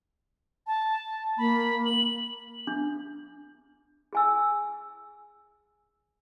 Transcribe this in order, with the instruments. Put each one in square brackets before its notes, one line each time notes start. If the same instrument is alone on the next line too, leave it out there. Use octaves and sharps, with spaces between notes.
[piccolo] A5
[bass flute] A#3 [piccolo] B5
[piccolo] F#7
[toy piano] D4
G#4 G#5 E6